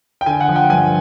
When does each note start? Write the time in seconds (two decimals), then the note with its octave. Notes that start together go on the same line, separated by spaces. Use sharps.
0.21 G5
0.26 D3 G#5
0.41 F#5
0.49 F3
0.56 G5
0.70 G2 G#5